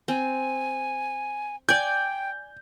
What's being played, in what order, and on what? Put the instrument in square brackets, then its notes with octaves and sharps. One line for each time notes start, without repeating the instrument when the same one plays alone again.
[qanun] C4 [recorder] G#5
[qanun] D5 G#5 [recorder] G5 [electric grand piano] G6